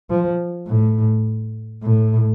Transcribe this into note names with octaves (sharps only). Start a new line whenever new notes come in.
F3
A2
A2